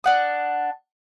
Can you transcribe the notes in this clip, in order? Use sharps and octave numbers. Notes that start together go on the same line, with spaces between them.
D4 F#5 D#6